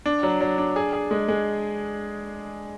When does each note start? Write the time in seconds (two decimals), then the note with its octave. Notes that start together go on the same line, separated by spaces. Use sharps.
0.06 D4
0.23 F#3
0.41 F#3
0.58 D4
0.76 G#4
0.93 G#4
1.11 G#3
1.28 G#3